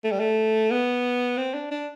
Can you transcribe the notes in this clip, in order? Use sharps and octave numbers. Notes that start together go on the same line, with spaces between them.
A3
G3
A3
B3
C4
D4
D4